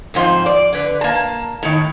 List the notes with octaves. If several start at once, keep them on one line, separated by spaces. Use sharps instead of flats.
F2 G#2 F3 C5
D5
D3 B4
A#3 A5
A2 D#3